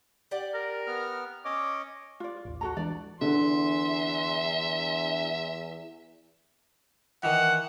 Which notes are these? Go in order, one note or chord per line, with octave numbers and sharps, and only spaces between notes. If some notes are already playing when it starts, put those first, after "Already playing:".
G4 D5 F#5
A#4
B3 F6
C#4 C#5 D#5 D6
F4 D5
A1 D#2
F#4 A4 A#5
E3 G#3 D4 D5
E2 D3 E5 C6
D#3 E3 F#5